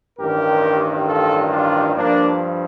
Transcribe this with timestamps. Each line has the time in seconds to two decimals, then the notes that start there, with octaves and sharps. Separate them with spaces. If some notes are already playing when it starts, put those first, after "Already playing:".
0.19 A1 G2 D#3 G3 G4 A#4
1.07 F4 A4
1.51 D4 F4
1.95 G2 F3 A#3 D4